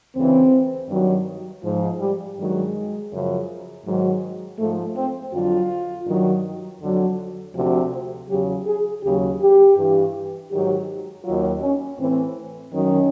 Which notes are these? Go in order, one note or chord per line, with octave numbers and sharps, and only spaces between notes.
D2 C#3 E3 C4
G2 D#3 F#3
G#2 F3
G3
G2 D#3 F#3 G#3
F#2 C#3 F3
G#2 D#3 F#3
G#2 F3 A3
C4
F2 D3 F#3 F4
G2 D#3 F#3
F2 D3 F#3
D2 C3 F3 F#4
E2 C#3 F#3 G4
G#4
D#2 C#3 F#3 G4
G4
G2 E3
G#2 D#3 F#3 G4
D#2 D#3 F#3 F4
C#4
A2 E3 C4
F#2 D#3 F#3 C#4